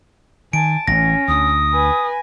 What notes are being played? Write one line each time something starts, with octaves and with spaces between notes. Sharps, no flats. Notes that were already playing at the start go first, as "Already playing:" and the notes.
D#3 G#5 A5 D7
A1 E3 C#4 A#6
D2 D#6
B4 G#5